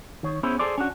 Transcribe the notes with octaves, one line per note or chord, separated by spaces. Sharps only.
D#3 C#5
B3 C#4 E4 G#4 C5
G#4 A4 C5 D5
C#4 D4 F#4